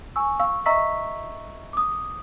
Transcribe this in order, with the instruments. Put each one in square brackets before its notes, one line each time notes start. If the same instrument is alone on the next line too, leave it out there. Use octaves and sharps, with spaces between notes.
[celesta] G#5 C#6 E6
F5 C#6 E6
D#5 E5 A#5 C#6 E6 B6
D6 D#6